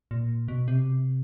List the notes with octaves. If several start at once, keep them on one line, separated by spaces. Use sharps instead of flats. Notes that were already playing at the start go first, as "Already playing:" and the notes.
A#2
B2
C3